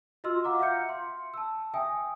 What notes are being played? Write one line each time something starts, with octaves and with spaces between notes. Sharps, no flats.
F4 F#4 D#5 C6 E6 F6
F5 F#5 A#5 D6
E5 F5 F6 G6 C#7
C6
A5 E6
E5 G5 G#5 D#6